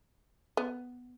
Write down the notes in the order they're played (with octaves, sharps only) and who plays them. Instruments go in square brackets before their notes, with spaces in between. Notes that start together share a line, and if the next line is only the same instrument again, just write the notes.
[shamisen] B3